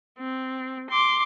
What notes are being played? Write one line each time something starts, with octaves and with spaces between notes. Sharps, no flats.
C4
C6 D6